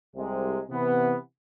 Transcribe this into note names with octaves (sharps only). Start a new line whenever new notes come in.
C2 C3 G#3
C3 E3 B3